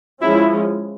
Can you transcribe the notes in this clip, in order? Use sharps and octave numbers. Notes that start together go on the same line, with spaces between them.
F3 G#3 C#4 E4